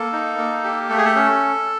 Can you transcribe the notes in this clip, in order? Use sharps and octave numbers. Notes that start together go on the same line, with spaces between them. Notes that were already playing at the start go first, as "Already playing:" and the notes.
Already playing: A#3 A4
D#4
A#3
G4
A3 A4
G#4
A4
C#4